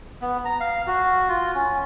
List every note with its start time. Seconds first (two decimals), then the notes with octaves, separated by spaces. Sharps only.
0.21 B3
0.45 A#5
0.60 F5
0.87 F#4
1.29 F4
1.55 C#4